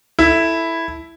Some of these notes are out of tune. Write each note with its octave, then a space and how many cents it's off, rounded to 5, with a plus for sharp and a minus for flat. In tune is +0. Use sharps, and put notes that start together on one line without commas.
E4 +0 A4 +0